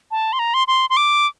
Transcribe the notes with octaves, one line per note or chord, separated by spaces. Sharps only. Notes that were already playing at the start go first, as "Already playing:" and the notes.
A5
C6
A#5
C6
C6
C6
D6